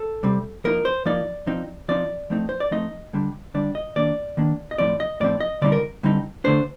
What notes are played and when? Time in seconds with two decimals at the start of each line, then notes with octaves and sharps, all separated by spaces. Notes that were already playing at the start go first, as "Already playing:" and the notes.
Already playing: A4
0.23 C3 G3 C4
0.64 F3 A#3 D#4 A#4
0.85 C5
1.06 F3 A#3 D#4 D5
1.47 F3 C4 D#4
1.88 F3 C4 D#4 D5
2.30 F3 A3 C4 D#4
2.49 C5
2.60 D5
2.71 F3 A3 C4 D#4 D#5
3.13 D3 G3 D4
3.54 D3 G3 D4 D5
3.75 D#5
3.96 D#3 A#3 D4 D5
4.37 D#3 A#3 D4
4.71 D#5
4.78 A2 F3 C4 D5
5.00 D#5
5.20 A2 F3 C4 D5
5.40 D#5
5.62 D3 G3 C4 D#4 D5
5.72 A#4
6.03 D3 G3 C4 D#4
6.44 D3 A3 D4 C5